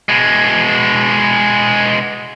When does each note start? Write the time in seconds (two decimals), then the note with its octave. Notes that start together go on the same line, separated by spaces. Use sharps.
0.09 B2 G#3